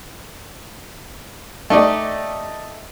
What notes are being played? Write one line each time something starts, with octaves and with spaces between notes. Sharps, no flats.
A3 D#4 G4 D5 D#5